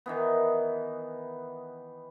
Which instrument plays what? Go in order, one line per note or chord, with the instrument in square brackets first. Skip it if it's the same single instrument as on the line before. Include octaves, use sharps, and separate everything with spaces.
[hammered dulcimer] D#3 E3 B3